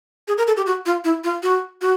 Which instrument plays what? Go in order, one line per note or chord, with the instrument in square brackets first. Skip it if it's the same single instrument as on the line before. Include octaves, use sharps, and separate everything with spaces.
[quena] G#4
A#4
A4
G4
F#4
F4
E4
F4
F#4
F#4